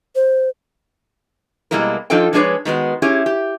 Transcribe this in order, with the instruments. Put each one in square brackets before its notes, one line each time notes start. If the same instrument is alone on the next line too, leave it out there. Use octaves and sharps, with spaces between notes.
[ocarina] C5
[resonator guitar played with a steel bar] B2 G3 G#3 A#3 E4 A#4
F3 D4 D#4 F4 A4 G5
F3 G#3 D4 G#4 B4 C#5
D#3 G#3 B3 F#4
C#4 E4 G4 G#4
G4